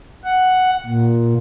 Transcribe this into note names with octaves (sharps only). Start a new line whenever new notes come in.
F#5
A#2